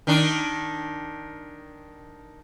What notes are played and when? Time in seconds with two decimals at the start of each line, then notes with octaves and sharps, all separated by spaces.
0.07 D#3 D4